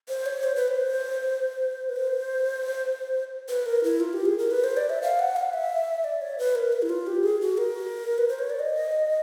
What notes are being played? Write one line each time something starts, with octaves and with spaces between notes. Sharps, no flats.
C5
C#5
C5
B4
C5
B4
C5
B4
A#4
E4
F4
G4
G#4
A#4
B4
C5
D5
E5
F5
F#5
F5
E5
D5
C#5
B4
A#4
B4
E4
F4
G4
G#4
F#4
A#4
B4
C5
C#5
D5
D#5